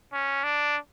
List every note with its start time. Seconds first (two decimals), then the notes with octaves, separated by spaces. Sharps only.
0.12 C#4
0.44 D4